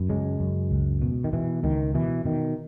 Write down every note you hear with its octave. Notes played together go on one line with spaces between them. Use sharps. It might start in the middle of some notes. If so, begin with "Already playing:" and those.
Already playing: F#2
C#3 G#3
F#2
C#2
B2
D#3
B2 E3
C#2 D#3
B2 E3
B2 D#3